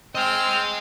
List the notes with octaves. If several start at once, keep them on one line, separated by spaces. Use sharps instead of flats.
C4 D#5 G5 G#5 F6